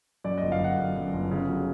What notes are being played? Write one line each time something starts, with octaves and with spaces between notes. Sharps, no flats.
F#2 D5
D#5
G1
F5
G1 F#5
F#2
F#2
G1
C#3
F#3